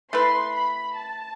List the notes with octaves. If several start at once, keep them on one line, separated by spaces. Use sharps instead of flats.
A3 E4 B4 C6
B5
A5